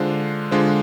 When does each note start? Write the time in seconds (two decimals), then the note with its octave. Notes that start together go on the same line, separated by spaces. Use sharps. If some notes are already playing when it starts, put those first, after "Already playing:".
Already playing: D3 G#3 D4 F4 C5
0.51 D3 G#3 D4 F4 C5